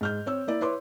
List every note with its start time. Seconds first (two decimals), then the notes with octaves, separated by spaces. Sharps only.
0.01 G#2 F6 G6
0.26 C4 C#5 E6
0.47 A#3 E4 D5
0.61 E4 B4 C#5 C6 D6